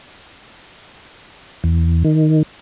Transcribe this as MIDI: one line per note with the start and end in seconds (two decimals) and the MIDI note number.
1.64 2.03 40
2.04 2.43 51